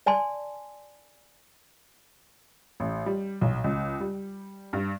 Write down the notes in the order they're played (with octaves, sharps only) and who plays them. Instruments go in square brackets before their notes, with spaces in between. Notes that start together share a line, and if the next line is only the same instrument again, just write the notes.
[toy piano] D5 G#5 A5 C6
[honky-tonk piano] A1
G3
B1
C#2
G3
G2